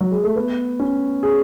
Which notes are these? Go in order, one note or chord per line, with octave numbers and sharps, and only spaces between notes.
F#3
G#3
A3
B3
C#4
G#4